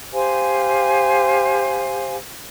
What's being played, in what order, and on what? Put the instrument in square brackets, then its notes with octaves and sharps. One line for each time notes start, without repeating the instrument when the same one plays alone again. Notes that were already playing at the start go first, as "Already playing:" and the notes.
[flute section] G4 C5 F5 G#5